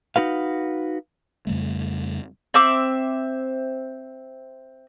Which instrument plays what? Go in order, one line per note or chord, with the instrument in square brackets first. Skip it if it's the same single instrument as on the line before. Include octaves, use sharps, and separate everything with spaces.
[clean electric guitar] D#4 F#4 B4 F5
[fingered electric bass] F2 C#3 G3 A3
[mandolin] C4 E5 D6